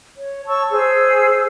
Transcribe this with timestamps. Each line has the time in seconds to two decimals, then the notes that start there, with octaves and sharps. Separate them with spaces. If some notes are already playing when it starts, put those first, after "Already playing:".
0.18 C#5
0.46 C#5 A5 C#6 E6
0.71 G#4 C5 E6